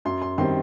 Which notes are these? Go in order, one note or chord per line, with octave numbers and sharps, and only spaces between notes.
F#2 C6
C6
D#3 G3 C4 C6